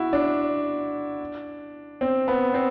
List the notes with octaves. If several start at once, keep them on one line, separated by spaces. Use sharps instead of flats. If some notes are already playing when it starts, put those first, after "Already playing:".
Already playing: E4 F#4
D4
C4
B3
C4